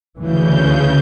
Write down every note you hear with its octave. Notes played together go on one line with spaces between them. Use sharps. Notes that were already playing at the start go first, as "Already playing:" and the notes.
D2 C#3 E3 G6